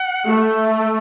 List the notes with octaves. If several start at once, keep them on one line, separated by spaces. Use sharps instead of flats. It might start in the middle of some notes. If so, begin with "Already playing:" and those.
Already playing: F#5
A3